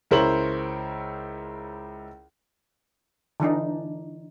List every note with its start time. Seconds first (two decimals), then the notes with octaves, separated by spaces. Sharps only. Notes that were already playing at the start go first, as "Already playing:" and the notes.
0.11 C#2 E4 A#4 C5 C#5 F#7
3.40 D3 E3 D4 D#4